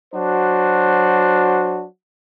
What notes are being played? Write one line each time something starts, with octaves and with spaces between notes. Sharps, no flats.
F#3 D4 F#4 C5